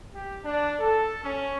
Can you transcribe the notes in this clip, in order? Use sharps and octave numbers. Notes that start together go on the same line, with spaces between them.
G4
D4
A4
C#4